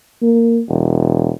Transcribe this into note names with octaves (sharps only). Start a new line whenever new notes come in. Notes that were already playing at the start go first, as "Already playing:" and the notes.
A#3
E1